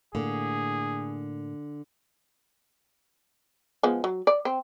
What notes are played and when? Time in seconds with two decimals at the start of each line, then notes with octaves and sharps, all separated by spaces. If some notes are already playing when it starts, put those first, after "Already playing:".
0.15 A2 D3 A#3 G#4
3.83 F3 G#3 B3
4.04 F#3
4.27 D5
4.45 C4